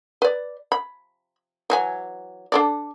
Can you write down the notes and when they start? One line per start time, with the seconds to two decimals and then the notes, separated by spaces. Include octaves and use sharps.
0.22 B4 D5
0.72 B5
1.70 E3 F#3 G#5
2.52 D4 A4 D5